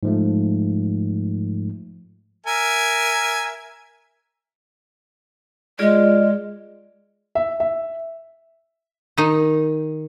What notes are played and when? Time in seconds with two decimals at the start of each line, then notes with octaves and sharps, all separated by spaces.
0.03 G#2 F3 A3
2.46 A#4 E5 G#5
5.79 G#3 F4 G#4 D5
7.35 E5
7.60 E5
9.17 D#3 D#4